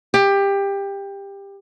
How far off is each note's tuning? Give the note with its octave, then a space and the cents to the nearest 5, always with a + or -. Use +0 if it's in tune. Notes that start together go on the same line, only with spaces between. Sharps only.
G4 +20